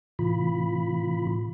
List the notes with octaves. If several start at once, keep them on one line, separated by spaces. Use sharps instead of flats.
A2 C3 E3 F4 B5